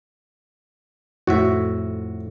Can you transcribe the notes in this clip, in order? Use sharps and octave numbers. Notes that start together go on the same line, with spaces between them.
F2 A2 F#4 E5